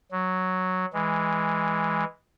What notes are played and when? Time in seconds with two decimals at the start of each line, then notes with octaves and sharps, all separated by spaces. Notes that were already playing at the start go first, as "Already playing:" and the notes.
0.11 F#3
0.93 E3 G#3